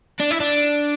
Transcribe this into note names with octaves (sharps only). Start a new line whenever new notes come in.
D4
E4
D4